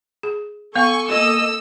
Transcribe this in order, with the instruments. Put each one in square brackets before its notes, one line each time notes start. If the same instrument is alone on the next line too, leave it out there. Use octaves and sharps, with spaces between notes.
[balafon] G#4
[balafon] B3 F5 [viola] A4 [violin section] G#5 C#6
[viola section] A#3 D#5 [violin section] E6